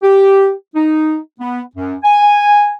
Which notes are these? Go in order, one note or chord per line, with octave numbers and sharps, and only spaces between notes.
G4
D#4
B3
F#2
G#5